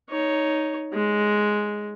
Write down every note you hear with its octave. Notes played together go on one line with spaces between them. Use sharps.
D#4 C#5
G#3